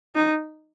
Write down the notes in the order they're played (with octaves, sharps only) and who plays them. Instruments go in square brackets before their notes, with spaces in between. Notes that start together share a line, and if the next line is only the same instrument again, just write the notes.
[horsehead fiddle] D#4